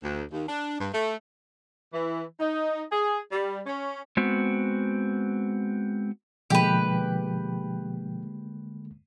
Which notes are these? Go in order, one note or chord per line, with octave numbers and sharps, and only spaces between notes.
D2
D#2
D4
G2
A3
E3
D#4
G#4
G3
C#4
G#3 B3 C4 F#4
B2 D3 F3 G#3 A#3 G4 B4 G5